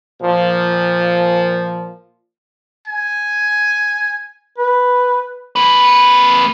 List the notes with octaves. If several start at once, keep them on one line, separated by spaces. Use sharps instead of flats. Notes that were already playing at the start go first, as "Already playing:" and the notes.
A#2 F3
G#5
B4
A#3 B4